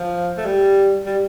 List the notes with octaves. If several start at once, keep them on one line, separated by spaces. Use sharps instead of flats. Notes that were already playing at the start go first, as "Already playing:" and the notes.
Already playing: F3
A3
G3
G3